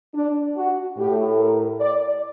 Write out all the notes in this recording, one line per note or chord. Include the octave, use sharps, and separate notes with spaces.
D4
F#4
A2 A3 G4
A#4
D5